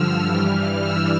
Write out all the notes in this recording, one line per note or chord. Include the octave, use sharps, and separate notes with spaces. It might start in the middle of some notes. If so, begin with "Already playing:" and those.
Already playing: G2 D3 F3 E6 F6
G2 E3 G3 F6
E6